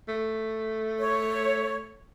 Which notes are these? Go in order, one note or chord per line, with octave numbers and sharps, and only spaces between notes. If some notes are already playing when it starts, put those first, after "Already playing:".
A3
C#5